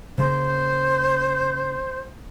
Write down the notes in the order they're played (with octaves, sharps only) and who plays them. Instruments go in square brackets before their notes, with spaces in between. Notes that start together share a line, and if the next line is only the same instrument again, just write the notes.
[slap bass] C#3 A#3 [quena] C5